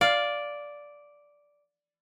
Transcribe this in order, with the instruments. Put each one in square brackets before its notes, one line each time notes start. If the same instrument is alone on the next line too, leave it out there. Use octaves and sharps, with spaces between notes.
[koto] D5 [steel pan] F5